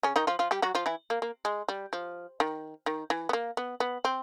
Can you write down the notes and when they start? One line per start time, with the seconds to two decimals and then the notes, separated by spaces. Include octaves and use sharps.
0.03 C#3 C#4
0.16 D#3 D#4
0.27 F3 F4
0.39 F3 F4
0.51 G3 G4
0.62 F#3 F#4
0.75 F3 F4
0.86 E3 E4
1.10 A#3
1.22 A#3
1.45 G#3
1.69 G3
1.93 F3
2.40 D#3
2.86 D#3
3.10 E3
3.29 B3
3.33 A#3
3.57 B3
3.80 B3
4.05 C4